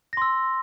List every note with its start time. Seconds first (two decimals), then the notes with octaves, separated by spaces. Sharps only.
0.13 A#6
0.17 C6
0.22 E6